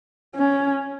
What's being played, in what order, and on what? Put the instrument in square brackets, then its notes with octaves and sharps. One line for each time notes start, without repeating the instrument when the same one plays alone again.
[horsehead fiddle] C#4